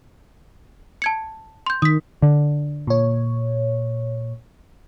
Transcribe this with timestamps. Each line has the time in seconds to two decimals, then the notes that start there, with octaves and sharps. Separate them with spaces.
1.02 A5 G#6 C#7
1.66 C6 G6
1.82 D#3 D#6 B6
2.22 D3
2.87 A#2 C#5